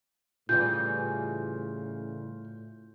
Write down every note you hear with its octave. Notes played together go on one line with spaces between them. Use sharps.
A2 C#3 E3 G3 F4 G6